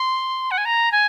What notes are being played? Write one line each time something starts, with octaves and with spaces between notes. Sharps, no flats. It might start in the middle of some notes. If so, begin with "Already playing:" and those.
Already playing: C6
F#5
G#5
A#5
G#5